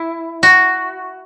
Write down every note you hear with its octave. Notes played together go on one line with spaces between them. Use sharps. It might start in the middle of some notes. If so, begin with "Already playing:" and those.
Already playing: E4
F#4